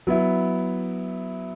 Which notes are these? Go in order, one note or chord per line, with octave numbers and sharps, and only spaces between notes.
F#3 B3 E4